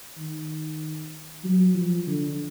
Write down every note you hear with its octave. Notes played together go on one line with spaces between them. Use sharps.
D#3
F#3
F3
D3